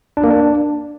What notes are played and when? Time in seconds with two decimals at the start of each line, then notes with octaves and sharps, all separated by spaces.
0.17 D4
0.24 A#3
0.30 D4